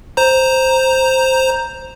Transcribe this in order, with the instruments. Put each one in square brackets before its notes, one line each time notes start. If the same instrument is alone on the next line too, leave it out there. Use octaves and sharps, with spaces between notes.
[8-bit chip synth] C5 A#5